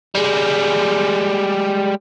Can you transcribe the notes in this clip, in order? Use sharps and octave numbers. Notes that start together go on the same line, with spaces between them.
G3 G#3